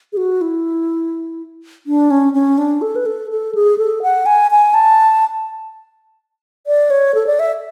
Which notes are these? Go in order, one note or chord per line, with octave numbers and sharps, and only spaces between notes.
G#4
F#4
E4
D4
C#4
C#4
D4
A4
B4
A4
A4
G#4
A4
F#5
G#5
G#5
A5
D5
C#5
A4
D5
E5